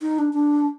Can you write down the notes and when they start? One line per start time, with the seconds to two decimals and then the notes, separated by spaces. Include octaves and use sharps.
0.02 D#4
0.19 D4
0.33 D4